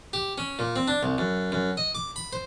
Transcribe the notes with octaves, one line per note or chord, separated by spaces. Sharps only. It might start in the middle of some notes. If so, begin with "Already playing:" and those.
G4
C#4
A#2
C4
D4
C2
F#2
F#2
D#5
D6
B5
C5